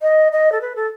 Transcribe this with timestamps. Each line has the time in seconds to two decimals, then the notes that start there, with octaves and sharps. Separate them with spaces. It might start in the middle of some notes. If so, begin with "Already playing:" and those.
0.02 D#5
0.32 D#5
0.52 A4
0.61 B4
0.75 A4